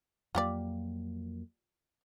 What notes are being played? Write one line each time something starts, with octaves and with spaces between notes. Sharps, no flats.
F2 F#3 A#3 F4 G4 D5